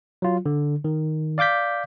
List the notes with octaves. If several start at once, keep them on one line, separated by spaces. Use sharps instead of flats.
F#3 F4
D3
D#3
D5 F5 D6 G6 B6